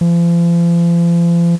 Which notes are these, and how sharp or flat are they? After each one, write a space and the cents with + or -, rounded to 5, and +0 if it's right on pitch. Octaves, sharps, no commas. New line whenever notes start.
F3 -40